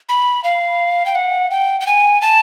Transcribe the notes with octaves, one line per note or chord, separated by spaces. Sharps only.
B5
F5
G5
F#5
G5
G5
G#5
A5